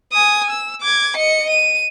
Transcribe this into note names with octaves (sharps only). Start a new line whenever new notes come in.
G#5 D#6
E6
D6 G#6
D#5 C#7
D#7